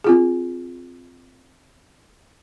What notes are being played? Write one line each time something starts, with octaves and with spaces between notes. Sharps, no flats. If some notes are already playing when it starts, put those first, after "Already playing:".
C4 F4 G#4